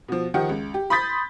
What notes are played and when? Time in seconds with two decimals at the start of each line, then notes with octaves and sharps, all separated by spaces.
0.08 B2 F3
0.34 D#3 F3 G4 F#5
0.49 C#2
0.74 G4
0.90 B5 C6 D#6 G6 A6 B6